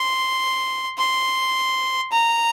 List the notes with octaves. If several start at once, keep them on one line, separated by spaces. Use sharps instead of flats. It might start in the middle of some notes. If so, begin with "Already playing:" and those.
Already playing: C6
C6
A#5